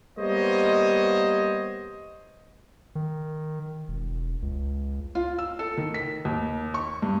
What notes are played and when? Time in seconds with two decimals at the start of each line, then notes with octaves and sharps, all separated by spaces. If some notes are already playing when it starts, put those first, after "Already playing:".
0.18 G3 A#3 B3 C5 C#5 D#5
2.95 D#3
3.88 E1
4.42 C#2
5.15 F4
5.39 E6
5.59 A4
5.77 D#3
5.94 B6
6.25 D#2
6.74 C#6
7.02 G2